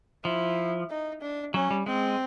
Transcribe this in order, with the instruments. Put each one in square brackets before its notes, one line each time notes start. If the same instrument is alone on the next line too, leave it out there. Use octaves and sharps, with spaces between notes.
[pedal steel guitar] F3 [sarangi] E4
[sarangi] D#4
D4
[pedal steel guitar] F#3 [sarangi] C#4
[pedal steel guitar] G3
[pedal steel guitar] G#3 [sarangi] C4